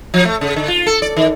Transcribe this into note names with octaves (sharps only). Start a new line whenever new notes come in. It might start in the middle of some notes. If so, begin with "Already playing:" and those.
F3
A3
C#3
D3
F4
A4
D5
D#3